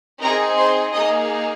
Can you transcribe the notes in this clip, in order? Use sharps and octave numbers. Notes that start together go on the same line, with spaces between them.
C4 D#4 G#4 A#4 A#5
C5 C6
A#3 D#4 G#4 D#5 D#6